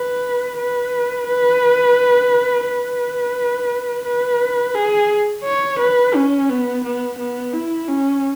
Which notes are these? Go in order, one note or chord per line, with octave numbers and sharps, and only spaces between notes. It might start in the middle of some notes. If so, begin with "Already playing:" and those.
Already playing: B4
B4
B4
B4
B4
G#4
C#5
B4
C#4
B3
B3
B3
E4
C#4